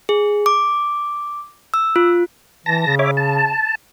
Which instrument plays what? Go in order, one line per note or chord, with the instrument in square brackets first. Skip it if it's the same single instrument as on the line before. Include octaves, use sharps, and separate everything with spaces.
[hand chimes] G#4
D6
E6
F4
[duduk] E3 [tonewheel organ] A5 A#6
[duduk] C#3
[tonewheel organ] C#5 E5 D6
A5